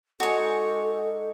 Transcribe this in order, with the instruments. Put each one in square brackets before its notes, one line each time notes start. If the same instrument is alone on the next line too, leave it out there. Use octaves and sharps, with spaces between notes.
[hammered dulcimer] G#3 D4 D#4 [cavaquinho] F#4 C#5 [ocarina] A4